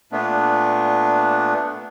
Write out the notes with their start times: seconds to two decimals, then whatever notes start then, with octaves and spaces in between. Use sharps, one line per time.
0.12 A#2 A3 B3 D4